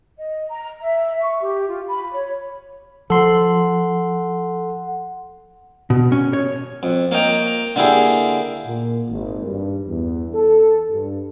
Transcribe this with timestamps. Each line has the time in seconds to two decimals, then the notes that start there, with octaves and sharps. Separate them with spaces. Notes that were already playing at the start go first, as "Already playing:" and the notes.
0.19 D#5
0.49 A#5
0.81 E5
1.21 C#6
1.41 G4
1.68 F4
1.88 B5
2.13 C#5
3.10 F3 A4 F#5 C6
5.90 B2
6.12 C#4
6.33 C#5
6.83 F2
7.11 A#3 C#5 D#5 G5 A#5
7.76 D3 A#3 E4 G4 G#4
8.66 A#2
9.09 G#1
9.44 G2
9.88 E2
10.34 A4
10.91 G2